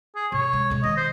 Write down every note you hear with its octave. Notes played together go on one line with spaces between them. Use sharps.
G#4
C3 C#5
G#3
B2 G#3
C3 D#3 D#5
C5